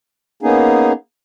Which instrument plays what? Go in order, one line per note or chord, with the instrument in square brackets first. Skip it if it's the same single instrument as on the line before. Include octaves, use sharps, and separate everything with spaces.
[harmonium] A#3 B3 C#4 D#4 G#4